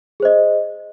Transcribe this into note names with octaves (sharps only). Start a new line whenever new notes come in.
G#4 C5 D#5